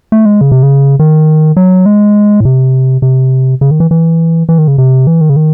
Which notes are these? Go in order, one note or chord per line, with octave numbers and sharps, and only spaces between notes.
A3
G#3
C#3
C3
C#3
D#3
F#3
G#3
A2
C3
C3
C#3
D#3
E3
E3
E3
D#3
C#3
C3
E3
D#3
C#3
D#3